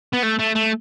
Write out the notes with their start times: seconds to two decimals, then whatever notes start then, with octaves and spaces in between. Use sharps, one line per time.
0.13 B3
0.22 A3
0.39 A3
0.55 A3